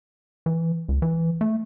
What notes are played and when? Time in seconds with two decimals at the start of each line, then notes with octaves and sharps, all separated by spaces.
0.46 E3
0.89 C#2
1.02 E3
1.41 A3